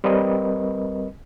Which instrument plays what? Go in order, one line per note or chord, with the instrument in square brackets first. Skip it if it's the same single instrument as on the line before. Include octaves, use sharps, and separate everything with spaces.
[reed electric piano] G3 C4 A#4 B4 D#5